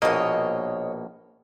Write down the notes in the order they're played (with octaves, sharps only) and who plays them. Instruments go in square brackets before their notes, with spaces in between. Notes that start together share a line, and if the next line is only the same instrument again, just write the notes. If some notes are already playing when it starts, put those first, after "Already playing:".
[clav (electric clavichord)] A#1 B2 A#3 [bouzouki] C#5 D#5